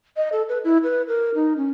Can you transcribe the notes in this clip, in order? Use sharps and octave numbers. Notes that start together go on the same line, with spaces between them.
D#5
A4
B4
E4
B4
A#4
D#4
C#4